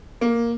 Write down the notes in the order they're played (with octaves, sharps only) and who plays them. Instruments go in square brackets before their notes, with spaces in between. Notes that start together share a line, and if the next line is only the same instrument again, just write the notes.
[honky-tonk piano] A#3